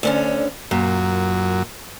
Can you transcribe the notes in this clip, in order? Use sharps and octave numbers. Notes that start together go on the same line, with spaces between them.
D2 D3 C#4
F#2 A#2